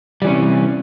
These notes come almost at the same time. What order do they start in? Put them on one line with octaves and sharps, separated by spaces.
G3 E3 C#4 C3